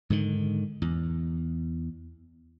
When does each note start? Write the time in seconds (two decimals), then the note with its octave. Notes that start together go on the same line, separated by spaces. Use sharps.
0.10 G#2 D3 D#3
0.82 E2